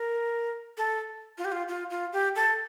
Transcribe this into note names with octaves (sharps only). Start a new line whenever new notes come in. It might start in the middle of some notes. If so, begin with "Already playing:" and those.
Already playing: A#4
A4
F4
G4
F4
F4
F4
G4
A4